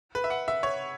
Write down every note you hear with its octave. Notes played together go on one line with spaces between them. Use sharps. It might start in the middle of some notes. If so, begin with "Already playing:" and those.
B4
E5
F#5
E5
C#5